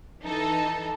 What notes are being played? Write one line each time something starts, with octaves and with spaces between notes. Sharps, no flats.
E3 D#4 A4